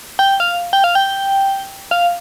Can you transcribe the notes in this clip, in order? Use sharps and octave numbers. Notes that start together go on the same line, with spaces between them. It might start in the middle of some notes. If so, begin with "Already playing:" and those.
G5
F5
G5
F5
G5
F5